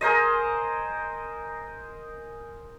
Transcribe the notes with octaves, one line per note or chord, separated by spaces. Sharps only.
G#4 A#4 C5 D#5